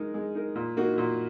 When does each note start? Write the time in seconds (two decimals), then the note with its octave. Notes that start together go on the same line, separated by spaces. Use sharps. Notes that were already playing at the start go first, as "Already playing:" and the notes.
Already playing: G#3 D#4 A#4
0.14 G#3
0.35 D#4 A#4
0.55 A#2
0.77 A#3 D#4 F#4
0.98 A#2